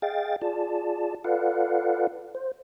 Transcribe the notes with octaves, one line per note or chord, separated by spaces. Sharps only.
G#4 D#5 F5 G5 A6
F4 G#4 D5 A5
F4 A4 B4 D5 F5 F#5
C5